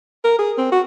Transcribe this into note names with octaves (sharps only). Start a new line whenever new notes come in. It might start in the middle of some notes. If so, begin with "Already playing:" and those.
A#4
G#4
C4
F#4